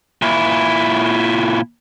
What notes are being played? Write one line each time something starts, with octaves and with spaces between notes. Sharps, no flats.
A#2 E4